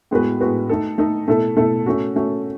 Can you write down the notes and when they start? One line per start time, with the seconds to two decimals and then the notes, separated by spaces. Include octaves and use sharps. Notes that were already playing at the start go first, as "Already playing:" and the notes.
0.11 A2 G#3 B3 F#4 B4
0.40 A2 G#3 B3 F#4 B4
0.69 A3 D#4 A4
0.98 A3 D#4 A4
1.28 B2 A3 E4 A4
1.56 B2 A3 E4 A4
1.86 A3 C#4 F#4
2.16 A3 C#4 F#4